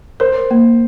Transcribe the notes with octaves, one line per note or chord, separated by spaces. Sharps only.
A#4 C5
A#3